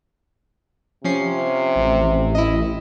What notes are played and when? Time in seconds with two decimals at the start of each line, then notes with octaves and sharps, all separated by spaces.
1.04 C3 F3 C#4 C7
1.75 A1
2.35 E4 D#5